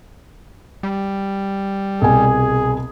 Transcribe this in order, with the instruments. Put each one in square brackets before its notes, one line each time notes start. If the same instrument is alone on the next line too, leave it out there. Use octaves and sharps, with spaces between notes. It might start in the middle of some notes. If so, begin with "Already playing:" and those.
[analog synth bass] G3
[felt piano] C2 B2 G#5 [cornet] G#4